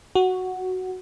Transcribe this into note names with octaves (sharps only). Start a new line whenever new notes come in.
F#4